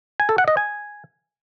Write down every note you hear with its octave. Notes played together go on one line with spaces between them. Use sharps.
G#5
A4
F#5
D#5
G#5